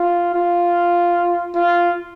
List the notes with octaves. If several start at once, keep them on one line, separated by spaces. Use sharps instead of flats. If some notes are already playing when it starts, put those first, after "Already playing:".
Already playing: F4
F4
F4